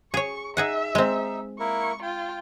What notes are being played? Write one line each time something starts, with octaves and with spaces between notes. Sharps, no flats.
G#4 C#5 C#6
D#4 G#4 E5 F#5
G#3 C4 D#4
A#3 E4 A#4 C#6
F4 G5